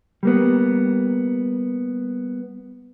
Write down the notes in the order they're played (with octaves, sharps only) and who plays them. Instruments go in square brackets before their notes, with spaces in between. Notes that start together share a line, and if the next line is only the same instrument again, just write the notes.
[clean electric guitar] G3 A#3 B3